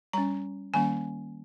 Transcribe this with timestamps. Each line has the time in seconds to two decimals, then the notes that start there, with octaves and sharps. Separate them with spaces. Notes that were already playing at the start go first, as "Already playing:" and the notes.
0.13 G3 C#4 A#5
0.74 D#3 G3 A#3 C#4 G#5